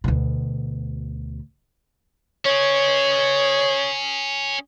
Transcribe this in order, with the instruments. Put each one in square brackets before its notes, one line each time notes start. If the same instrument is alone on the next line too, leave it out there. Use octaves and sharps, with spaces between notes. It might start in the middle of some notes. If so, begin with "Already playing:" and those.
[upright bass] D2 B2
[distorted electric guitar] C#4 G#4 [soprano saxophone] C#5